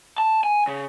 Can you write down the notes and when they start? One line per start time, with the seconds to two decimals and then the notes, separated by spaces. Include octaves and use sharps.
0.18 A5
0.44 G#5
0.67 C#3